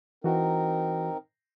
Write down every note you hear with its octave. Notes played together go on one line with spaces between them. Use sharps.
E3 C4 D#4 F#4 A#4